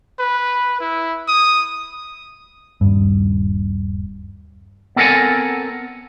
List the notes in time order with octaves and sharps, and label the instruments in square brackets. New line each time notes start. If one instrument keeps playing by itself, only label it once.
[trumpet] B4
E4
D#6
[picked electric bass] D#1 G2
[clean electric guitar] B3 C4 A4 A#4 F#5 G#5